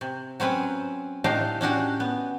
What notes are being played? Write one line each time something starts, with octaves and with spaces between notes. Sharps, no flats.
C3
F#3 C4 C#4 B4
A2 D4 D#4 G4 A4 F5
C#4 D4 F#4 G4
B3